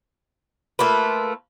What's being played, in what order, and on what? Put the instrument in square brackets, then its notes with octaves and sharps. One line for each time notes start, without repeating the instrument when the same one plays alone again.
[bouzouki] A3 A#3 F4 B4